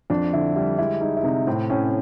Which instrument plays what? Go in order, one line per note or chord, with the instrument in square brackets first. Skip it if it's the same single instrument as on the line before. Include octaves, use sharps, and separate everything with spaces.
[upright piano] F2 D4
D3 E4
G3 E4
G#3 E4
G#3 D#4
E4
C3 D#4
A2 C4
A2 C#4